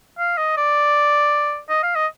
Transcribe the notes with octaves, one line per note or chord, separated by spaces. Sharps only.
F5
D#5
D5
D#5
F5
D#5